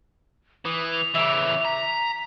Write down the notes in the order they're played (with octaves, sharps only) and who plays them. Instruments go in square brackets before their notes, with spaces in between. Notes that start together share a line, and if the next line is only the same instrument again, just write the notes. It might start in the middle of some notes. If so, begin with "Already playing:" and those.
[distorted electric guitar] E3 [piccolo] D#6
[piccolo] F7
[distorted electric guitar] C#3 E3 [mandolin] E5 D6
[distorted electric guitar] A#5 [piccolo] B6